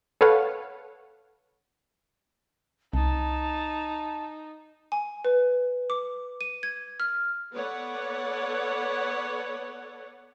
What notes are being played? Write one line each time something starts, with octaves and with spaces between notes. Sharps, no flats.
A4 B4 C#5 F5 F#5
C2 D#4 A5
G#5
B4
D6
D#7
G#6
F6
B3 A4 B4 C#5 D5 F#5